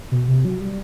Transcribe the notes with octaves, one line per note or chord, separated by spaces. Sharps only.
B2
C3
F#3
G3